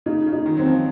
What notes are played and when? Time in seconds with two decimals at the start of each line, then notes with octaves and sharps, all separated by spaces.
0.06 C#3 D#4
0.26 C#3
0.33 D#4
0.46 D#3
0.57 F#3 C4
0.66 F3